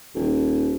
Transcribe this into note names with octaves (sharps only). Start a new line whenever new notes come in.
D#1